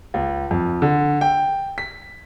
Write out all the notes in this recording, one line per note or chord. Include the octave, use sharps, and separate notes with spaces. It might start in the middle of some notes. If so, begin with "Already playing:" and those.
C#2
F2
D3
G5
B6